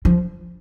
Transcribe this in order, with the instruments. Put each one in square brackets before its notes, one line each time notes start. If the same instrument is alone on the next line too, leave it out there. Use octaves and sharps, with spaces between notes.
[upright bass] F3